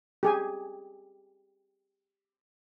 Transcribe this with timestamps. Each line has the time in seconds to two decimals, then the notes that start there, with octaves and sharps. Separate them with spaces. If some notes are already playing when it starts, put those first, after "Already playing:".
0.23 G4 G#4 G#5